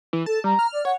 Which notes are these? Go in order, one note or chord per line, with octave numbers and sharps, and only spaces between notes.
E3
A4 A5
G3 A#5
F6
D5
C#5 F#5